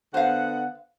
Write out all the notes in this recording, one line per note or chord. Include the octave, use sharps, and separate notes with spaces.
D3 B3 C5 F5 F#5